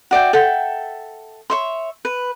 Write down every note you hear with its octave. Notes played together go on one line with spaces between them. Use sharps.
F#4 D5 E5 G5
A4 E5 F#5 G5
C#5 E5 C6
B4